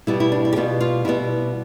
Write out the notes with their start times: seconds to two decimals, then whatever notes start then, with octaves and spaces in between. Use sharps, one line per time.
0.07 B2 G3 B3 E4
0.20 E4
0.32 D4
0.45 E4
0.53 G4
0.56 B2 G3 B3 F4
0.81 F4
1.05 B2 G3 B3 E4